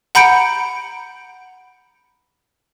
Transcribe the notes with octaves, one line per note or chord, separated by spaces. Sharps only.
F#5 A#5 B5 G6 C#7 D7